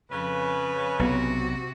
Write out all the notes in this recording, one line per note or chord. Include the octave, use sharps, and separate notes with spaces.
F2 C#3 B4
B1 C3 B3 F#4